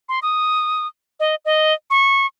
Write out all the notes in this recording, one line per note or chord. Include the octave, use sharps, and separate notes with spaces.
C6
D#6
D#5
D#5
C#6